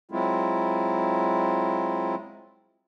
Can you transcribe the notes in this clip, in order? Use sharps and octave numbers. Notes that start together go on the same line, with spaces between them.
F#3 G#3 C4 E4 F4